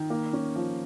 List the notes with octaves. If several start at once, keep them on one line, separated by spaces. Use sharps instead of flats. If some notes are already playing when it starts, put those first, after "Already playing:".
Already playing: D#3
A#3
C#4
F3